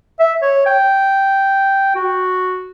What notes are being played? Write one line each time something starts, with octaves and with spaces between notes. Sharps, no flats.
E5
C#5
G5
F#4